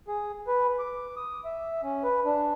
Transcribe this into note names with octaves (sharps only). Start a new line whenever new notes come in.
G#4
B4
D6
D#6
E5
C#4
B4
D4